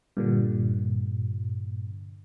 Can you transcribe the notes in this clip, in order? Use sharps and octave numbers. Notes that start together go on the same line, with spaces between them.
G2 A#2 D3